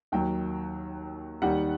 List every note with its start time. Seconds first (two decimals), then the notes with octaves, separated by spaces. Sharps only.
0.12 D#2 D#3 F#3 G5
1.42 D#2 D#3 G3 F#5